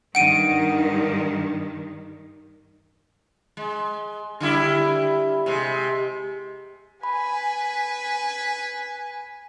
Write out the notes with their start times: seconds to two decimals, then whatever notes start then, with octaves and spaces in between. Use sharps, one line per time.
0.15 G2 D#3 F#5 D7 D#7
3.57 G#3
4.40 D3 G3 E4
5.46 C3 G#3
7.03 B4 G#5 B5